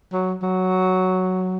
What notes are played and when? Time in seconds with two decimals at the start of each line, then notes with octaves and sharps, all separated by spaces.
0.13 F#3
0.43 F#3